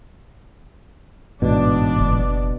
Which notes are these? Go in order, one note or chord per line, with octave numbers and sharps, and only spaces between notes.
A1 G#2 B2 B3 D4 D5
F#1